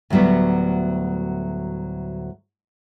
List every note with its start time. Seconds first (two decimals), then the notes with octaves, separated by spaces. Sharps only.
0.10 D2 A2 F#3 G3 B3